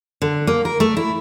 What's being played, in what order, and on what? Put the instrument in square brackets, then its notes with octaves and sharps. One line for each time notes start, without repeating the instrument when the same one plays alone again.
[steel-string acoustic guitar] D3
A#3
A#4
A3
E4